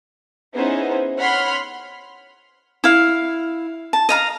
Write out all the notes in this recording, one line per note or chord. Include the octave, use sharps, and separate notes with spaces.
B3 C#4 D#4 E4 G#4 C5
C#5 F#5 B5 C6 F6
E4 F5
A5
D#5 F5 A#5